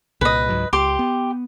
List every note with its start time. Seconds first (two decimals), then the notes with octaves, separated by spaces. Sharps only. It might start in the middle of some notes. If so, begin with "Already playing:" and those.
0.21 C2 A#2 B4 D#5
0.49 C#2 G#2 F#3
0.73 C#2 G4 C6 D6
0.99 B3